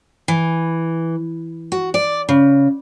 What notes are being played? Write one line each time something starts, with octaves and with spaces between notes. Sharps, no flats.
E3
F#4
D5
C#3